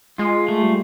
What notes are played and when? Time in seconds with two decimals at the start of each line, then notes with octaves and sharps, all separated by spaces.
0.18 G#3 F4
0.48 A3
0.62 G3